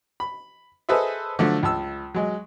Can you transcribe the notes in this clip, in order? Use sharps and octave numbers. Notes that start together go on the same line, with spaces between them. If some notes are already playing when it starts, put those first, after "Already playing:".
B5
G#4 A4 B4 C5 D#5 E5
D3 F3 F#3 A3
C#2 A5 E6
F#3 G#3